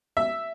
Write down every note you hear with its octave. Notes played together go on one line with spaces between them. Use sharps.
E5